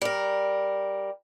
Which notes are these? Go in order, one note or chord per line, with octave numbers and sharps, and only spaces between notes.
G3 A#4